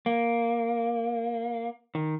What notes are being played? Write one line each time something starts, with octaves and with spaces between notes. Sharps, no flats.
A#3
D#3